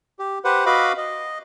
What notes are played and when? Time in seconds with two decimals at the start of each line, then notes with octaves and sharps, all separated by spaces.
0.19 G4
0.44 G4 B4 C5 F#5
0.66 F#4 B4 D#5 F5 B5 D6
0.98 D#5